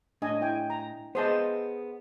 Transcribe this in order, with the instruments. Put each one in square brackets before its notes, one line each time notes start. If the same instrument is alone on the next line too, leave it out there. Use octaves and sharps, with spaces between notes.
[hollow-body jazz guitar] A2 [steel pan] D4 D#5 G#5
[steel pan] E4 G5 G#5
A#5
[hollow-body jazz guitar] B3 G#4 D#5 [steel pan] C5 A5